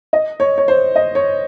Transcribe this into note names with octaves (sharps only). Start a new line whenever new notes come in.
D#5
C#5
C#5
C5
D#5
C#5